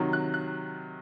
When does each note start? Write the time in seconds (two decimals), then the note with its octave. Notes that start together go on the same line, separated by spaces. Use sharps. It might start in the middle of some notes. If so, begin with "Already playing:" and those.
Already playing: C3 D#3 F#3
0.13 F#6
0.34 F#6